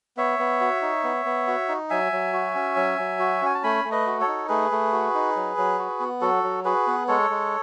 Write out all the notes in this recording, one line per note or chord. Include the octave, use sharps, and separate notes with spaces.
B3 C#5 E5
B3
F#4
D#4
B3
B3
F#4
D#4
F#3 E5 G#5
F#3
F#4
C#4
F#3
F#3
F#4
C#4 G#5
A5
A3 G#5 B5
A3
B4 D#5
F#4
A4 C#5
D#4
A3 G#4 B4
A3
F#4
D#4
F#3
F#3
F#4
B3
F#3 F#4 A4
F#3
F#4 G#4 B4
B3
G#3 A4 C#5
G#3